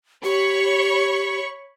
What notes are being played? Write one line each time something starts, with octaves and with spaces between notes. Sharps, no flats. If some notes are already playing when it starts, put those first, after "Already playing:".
G4 C#5 B5 C#6